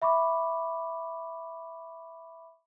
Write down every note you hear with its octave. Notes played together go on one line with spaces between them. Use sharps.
E5 B5 C#6 D6